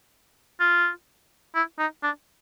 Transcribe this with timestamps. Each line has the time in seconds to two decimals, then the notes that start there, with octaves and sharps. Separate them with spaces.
0.60 F4
1.55 E4
1.79 D#4
2.03 D4